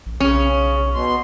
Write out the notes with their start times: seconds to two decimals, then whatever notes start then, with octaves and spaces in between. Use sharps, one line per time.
0.06 A1
0.20 B1 C#3 C#4
0.94 B2 C6